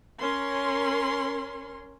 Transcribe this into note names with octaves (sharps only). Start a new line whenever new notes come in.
C#4 A#4 C6